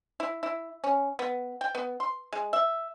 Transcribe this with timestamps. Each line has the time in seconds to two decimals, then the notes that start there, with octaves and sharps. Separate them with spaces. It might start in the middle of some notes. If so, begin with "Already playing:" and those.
0.20 E4
0.43 E4
0.84 C#4
1.19 B3
1.61 G5
1.75 B3
2.00 C6
2.33 G#3
2.53 E5